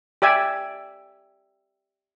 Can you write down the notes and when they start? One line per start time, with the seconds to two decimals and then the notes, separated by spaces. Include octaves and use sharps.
0.22 G4 D5 E5 G#5